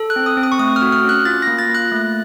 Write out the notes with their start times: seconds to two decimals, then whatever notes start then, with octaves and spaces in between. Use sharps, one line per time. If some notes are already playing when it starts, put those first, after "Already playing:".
Already playing: A4
0.10 F#6
0.16 C4
0.26 D#6
0.37 C4
0.43 D#6
0.52 C#6
0.59 A3 D#6
0.76 F6
0.82 F#4
0.92 F6
1.04 C#4
1.09 F#6
1.25 F4 A6
1.42 A#3 A#6
1.59 A6
1.69 A#3
1.75 F#6
1.92 A3